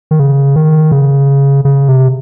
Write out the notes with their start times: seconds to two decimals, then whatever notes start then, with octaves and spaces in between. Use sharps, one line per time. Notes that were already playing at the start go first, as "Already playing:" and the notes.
0.11 D#3
0.20 C#3
0.56 D#3
0.92 C#3
1.65 C#3
1.89 C3